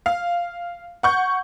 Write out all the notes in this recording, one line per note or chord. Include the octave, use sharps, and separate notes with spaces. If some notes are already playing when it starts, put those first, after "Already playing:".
F5
F#5 C#6 G6